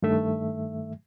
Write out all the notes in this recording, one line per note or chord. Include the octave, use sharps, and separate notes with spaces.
G2 D#3 A3 E5